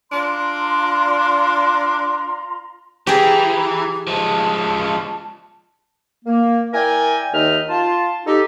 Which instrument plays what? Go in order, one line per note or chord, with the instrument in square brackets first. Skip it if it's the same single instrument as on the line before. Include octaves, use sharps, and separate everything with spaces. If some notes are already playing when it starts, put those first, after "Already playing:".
[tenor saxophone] D4 [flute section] F4 A#5 C6
[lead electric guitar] E3 [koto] G4 G#4 [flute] A#5
[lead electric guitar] F3 G#3 [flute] A5
[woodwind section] A#3
E4 A#4 D5 G5 G#5
D#2 D#3 D#4 D#5 E5 F6
F4 A5
D#4 G4 A4